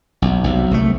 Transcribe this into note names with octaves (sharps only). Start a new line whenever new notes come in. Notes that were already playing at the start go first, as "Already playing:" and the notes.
B1
B1 C3
C2 F#3 A3